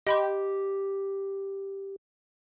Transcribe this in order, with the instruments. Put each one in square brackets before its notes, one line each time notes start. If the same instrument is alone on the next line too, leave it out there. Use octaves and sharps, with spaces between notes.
[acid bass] G4 [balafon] D#5 B5 C6